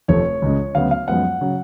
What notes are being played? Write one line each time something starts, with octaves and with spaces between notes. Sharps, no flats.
F1 F2 F3 A3 C#5
C#2 C#3 G#3
D2 C#3 F#3 B3 F5
F5
F#2 F3 G#3 B3 F#5
C#3 F#3